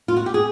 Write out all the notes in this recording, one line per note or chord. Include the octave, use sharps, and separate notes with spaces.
F4
F#4
G4
G#4